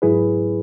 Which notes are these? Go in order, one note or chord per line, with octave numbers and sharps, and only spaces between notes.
G#2 F#3 E4 G#4 B4